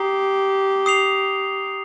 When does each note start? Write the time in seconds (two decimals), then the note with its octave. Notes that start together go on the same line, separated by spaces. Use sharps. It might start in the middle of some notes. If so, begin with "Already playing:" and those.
Already playing: G4 A#5 D#6 C7
0.86 D#6 C7 F7